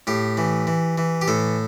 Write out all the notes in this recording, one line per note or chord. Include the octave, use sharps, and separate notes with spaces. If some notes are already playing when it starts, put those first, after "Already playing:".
A2 G4
E3
E3
E3
G4
A2 A4